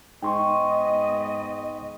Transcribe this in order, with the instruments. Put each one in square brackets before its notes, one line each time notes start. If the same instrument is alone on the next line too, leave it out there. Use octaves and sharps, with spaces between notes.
[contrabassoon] G#2 [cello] B3 D#5 [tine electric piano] G5 C6 C#6